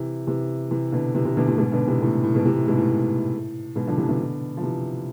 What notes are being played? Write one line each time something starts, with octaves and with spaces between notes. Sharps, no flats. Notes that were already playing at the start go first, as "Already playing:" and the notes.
Already playing: C3 E3
C3 E3
C3 E3
B2 D3
C3 E3
C3 E3
B2 D3
A2 C3
G#2 B2
B2 D3
C3 E3
A2 C3
A2
G#2 B2
C3 E3
A2
G#2 B2
A2
A2
G#2 B2
D3 F3
C3 E3
B2 D3
F3
C3 E3